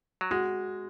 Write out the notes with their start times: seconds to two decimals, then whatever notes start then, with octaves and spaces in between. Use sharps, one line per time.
0.21 F#3
0.31 G#3 F#4